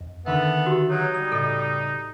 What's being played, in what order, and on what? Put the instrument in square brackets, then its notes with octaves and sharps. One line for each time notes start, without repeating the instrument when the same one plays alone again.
[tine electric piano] F2
[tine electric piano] D3 D#3 E5 [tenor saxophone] B3 [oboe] A4
[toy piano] F#4 G4
[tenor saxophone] F#3 [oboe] D#4
[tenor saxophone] G3 [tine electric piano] D#6 G#6
[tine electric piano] A2 C#3 G4 [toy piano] A4 D#5